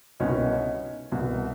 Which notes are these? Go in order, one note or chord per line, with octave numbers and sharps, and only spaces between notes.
C2 B2 C#4 D#4
C2 B2